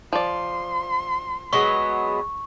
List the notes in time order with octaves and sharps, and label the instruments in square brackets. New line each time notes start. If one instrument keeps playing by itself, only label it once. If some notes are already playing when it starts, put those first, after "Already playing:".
[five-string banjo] F3 D5 [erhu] C6
[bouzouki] F#3 G#3 B3 [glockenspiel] C#6